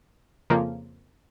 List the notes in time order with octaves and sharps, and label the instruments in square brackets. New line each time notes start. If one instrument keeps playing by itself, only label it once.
[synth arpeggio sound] F2 C#3 F3 A#3